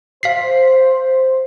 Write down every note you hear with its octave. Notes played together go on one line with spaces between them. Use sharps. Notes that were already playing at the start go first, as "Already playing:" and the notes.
C5 F5 B6 C7